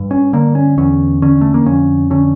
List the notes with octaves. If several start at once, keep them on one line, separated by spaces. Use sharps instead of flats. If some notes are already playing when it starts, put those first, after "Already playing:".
Already playing: G2
C#4
D3 A#3
C#4
E2 C#4
D3 C#4
A3
A#3
F2 C#4
D3 C#4